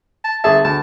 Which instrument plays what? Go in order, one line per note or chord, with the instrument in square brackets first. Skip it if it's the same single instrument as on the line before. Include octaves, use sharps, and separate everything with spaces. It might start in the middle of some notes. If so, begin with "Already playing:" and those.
[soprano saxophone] A5
[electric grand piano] G1 G#4 E5 [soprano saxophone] A5
[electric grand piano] D2 [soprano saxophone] A5